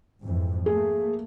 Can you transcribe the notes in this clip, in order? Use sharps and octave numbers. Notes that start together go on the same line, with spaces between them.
F2 G#2 E3
A3 A#3 G#4